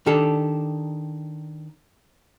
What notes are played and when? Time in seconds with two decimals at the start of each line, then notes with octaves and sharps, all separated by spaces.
0.06 D#3 D4 G4 A4